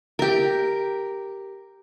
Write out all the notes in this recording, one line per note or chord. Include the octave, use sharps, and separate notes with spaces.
G4 A#4